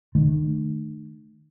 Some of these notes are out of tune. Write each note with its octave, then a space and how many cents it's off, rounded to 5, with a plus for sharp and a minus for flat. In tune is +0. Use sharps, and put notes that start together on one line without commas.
D#3 -40 A3 -15